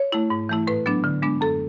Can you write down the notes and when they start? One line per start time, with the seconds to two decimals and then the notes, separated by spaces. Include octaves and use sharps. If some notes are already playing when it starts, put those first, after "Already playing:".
Already playing: C#5
0.12 A3 E4
0.30 G#2
0.49 E3 A3 E4
0.67 A2 B4
0.86 F#3 B3 D4
1.04 D3
1.22 G#3 B3 D4
1.41 F#2 A4